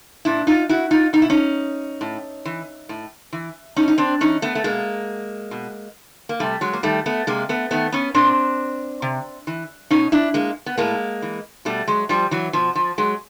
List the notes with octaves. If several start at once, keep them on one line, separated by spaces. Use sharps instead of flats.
A#2 D4 E4
D#4 F4
E4 F#4
D#4 F4
B2 D#4
E4
C#4 D#4
A2
E3
A2
E3
A2 C#4 D#4
D#4
C4 D4
E3 C#4 D#4
A3 B3
A3
B2 G#3 A#3
B2
A#3
C3 G3 A3
F#3 G#3
A#3
D#3 G3 A3
A3 B3
C3 G#3 A#3
A3 B3
D#3 A3 B3
B3 C#4
A#2 C4 D4
C3
E3
B2 C#4 D#4
D4 E4
G#3 A#3
B3
A2 G#3 A#3
E3
B2 G3 A3
F#3 G#3
F3 G3
E3 F#3
B2 F3
F3
F#3 G#3